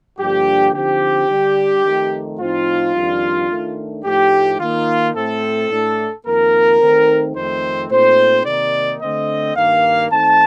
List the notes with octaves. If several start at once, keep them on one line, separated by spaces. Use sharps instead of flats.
G2 D3 F3 A#3 D4 G4
D3 F3 C4 D#4 G4
D3 G3 D4
F2 D#3 A3
A2 F3 C4 D#4 F4
F2 D#3 G3 D4
D#3 A3 D4
A2 F3 A3 D#4 G4
D#3 A#3 D#4 F4
A2 A3 C4 A4
A2 A3 D4
F2 D#3 A#3 D#4 A#4
D#3 A3 C4 D#4
F2 D#3 A3 C4 C5
A#2 A3 C4 D#4 C5
C3 D#3 A#3 D#4 D5
D3 A3 C4 D#5
G2 D#3 A#3 F5
D#3 A3 C4 D#4 A5